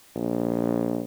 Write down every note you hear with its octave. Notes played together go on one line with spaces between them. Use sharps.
A#1